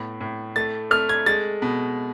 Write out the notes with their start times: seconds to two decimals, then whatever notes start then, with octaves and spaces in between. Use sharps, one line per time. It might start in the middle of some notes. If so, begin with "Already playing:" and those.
Already playing: A2 B3
0.21 A2
0.56 A3 A6
0.91 A3 F6
1.09 G#6
1.26 G#3 A6
1.62 B2